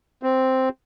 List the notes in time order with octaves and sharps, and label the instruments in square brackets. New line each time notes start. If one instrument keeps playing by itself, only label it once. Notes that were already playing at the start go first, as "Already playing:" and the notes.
[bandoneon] C4